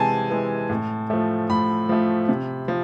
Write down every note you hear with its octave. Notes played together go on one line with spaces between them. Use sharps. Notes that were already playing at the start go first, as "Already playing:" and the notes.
Already playing: C3 E3 G#3 G#5 A5
E3 G#3
A2
F3 A3
A2 B5
F3 A3
C3
F3